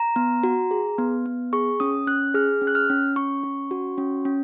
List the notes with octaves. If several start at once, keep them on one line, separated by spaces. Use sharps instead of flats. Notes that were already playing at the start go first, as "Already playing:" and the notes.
Already playing: A#5
B3
F#4
G#4
B3
B3
G#4 C#6
C#4 D#6
C#4 F#6
G#4 F6
C#4
F#6
F6
C#4
C#4 C#6
C#4
F#4
C#4
C#4